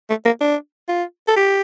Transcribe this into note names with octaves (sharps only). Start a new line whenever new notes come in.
A3
A#3
D4
F4
A4
G4